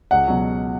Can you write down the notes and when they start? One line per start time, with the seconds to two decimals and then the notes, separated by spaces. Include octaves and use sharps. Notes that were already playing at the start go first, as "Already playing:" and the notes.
0.11 C#2 F#5
0.27 B2 F#3